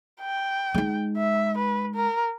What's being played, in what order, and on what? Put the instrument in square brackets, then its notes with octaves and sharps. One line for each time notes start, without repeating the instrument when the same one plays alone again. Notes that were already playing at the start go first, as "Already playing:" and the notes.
[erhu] G5
[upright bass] G#3 D#4
[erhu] E5
B4
A#4